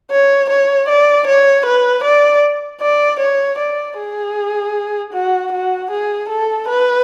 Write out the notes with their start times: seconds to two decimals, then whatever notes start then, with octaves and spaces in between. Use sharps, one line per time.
0.11 C#5
0.50 C#5
0.89 D5
1.27 C#5
1.66 B4
2.04 D5
2.82 D5
3.20 C#5
3.58 D5
3.98 G#4
5.13 F#4
5.52 F#4
5.91 G#4
6.29 A4
6.68 B4